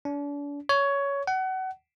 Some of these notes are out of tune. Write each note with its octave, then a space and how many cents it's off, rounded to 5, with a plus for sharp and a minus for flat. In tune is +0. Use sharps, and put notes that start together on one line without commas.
D4 -40
C#5 +15
F#5 +30